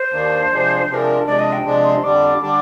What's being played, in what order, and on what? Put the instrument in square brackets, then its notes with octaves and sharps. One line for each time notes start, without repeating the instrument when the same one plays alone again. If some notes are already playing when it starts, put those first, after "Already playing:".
Already playing: [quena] C5
[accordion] D#2 D#3 A#3 D4
C3 F3 G#3 D4
[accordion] C3 F3 G#3 D4 [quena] A#4 C5
[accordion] C3 F3 G#3 D4 [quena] D5
[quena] D#5
G5
[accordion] C3 F3 G#3 D4
[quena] C6
[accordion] F2 D3 G3 D4 [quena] D6
[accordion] D3 G3 D4